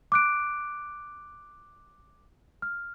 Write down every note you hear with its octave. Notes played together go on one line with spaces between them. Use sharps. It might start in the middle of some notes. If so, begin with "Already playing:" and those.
D6 F#6 D7
F6